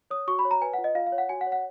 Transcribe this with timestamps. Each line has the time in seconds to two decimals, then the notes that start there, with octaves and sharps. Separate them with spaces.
0.11 C#5 D#6
0.28 F#4 C#6
0.39 B5
0.45 C#5
0.51 A#5
0.61 B4 G#5
0.73 F4 F#5
0.84 D#5
0.95 F4 F5
1.07 F5
1.12 C#5
1.18 F#5
1.29 F#4 G#5
1.41 F#5
1.47 C#5
1.52 F#5